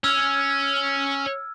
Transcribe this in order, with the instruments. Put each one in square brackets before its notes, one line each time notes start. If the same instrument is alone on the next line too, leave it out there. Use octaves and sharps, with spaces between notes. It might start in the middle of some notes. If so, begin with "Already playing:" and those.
[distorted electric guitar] C#4 [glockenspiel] E6 F6 G#6